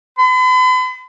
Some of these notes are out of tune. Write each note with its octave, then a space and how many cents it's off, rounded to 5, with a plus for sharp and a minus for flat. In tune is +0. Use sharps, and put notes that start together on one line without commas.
B5 +45